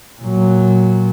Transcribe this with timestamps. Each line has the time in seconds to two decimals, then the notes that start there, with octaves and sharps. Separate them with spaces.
0.21 A#2 F#3